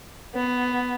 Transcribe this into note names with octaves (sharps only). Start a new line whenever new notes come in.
B3